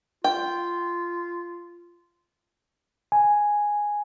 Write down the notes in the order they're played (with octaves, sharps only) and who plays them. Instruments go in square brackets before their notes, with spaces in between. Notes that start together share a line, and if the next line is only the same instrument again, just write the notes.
[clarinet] F4 [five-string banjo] G5
[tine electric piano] G#5